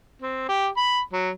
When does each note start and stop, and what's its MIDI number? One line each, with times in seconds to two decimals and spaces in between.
0.22 0.46 60
0.48 0.67 67
0.77 0.99 83
1.13 1.30 54